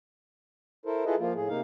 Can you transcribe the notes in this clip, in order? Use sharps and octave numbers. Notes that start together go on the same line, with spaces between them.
E4 A4 A#4 C5
E4 F4 G#4 A4 B4 D#5
F3 A#3 F4
A2 G#4
C3 A#3 D#4 F5